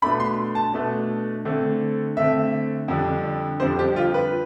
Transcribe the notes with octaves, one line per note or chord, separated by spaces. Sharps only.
B2 A3 D4 B5
C6
A5
B2 A3 D4
D3 A3 C4
D3 A3 C4 E5
F2 D3 G3 D4
F2 D3 G3 D4 C5
G4
F4
B4